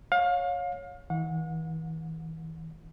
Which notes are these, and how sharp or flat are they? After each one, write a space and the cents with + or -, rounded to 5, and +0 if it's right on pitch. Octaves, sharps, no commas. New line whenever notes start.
C#5 +0 F5 +30
E3 -40 F#5 -40